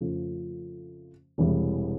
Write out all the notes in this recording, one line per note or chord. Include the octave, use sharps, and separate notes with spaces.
F2 C#3 F3 A3
E1 E2 C3 E3 G3